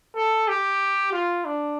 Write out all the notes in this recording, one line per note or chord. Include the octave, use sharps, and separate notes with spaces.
A4
G4
F4
D4